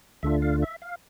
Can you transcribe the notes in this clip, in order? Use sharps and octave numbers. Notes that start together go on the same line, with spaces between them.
D2 D3 A3 D4 F4 E5
F5
E5
F5